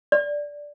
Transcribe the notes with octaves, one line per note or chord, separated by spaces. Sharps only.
D5